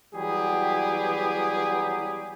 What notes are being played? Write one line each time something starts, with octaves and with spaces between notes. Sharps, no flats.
E3 F#3 G3 B3 G4 G#4